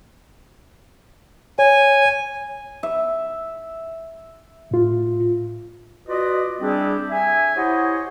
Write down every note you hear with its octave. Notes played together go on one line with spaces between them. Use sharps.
C#5 G#5
E5
A2 F4
F4 F#4 B4 D5 D#5
G3 C4 D4 E4 G4 G#4
E5 G#5
E4 G4 C5 C#5 D#5 F#5